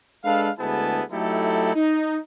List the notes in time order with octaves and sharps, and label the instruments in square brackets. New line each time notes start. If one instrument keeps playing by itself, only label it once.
[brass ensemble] G#3 D4 A4 B4 F5
D2 G#3 B3 E4 G#4 A5
F#3 A3 D#4 E4 G4 A4
D#4